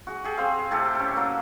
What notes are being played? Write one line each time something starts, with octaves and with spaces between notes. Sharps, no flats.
F#4 G#4
G4 G#4
C4 C5 F5
A2 C3 G4 A4
C#4 A4
F#3 A#3